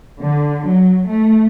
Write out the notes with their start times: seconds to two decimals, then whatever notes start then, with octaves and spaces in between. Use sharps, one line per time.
0.20 D3
0.67 F#3
1.09 A3